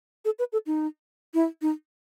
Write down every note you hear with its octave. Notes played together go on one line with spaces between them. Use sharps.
A4
B4
A4
D#4
E4
D#4